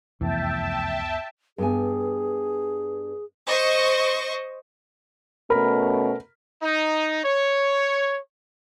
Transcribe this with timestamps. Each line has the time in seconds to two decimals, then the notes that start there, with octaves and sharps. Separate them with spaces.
0.21 F1 C#2 F#2 E3 B3 E5 G5 A5
1.58 G2 B3 G#4 G#5
3.48 C5 D#5 C#6
5.50 B2 A3 C#4 A#4 B5
6.62 D#4
7.25 C#5